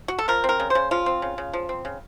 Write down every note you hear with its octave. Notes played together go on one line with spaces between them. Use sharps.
F#4
A4
F3 A#4
C4
A#4
C#3
C5
C#3
F3 F4
C4
C#3
C#3
F3
C4
C#3